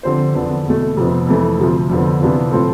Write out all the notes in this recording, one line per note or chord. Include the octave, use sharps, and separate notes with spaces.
D3 F3 C4 G4 C5
E2 D3 F3 B3 D4
E2 B2 A3
F2 C3 F3 B3
F2 E3 A3
D2 C3 F3
F2 D3 F3 B3
C3 E3 B3 D4 F4
A2 F3 C4 F4 A4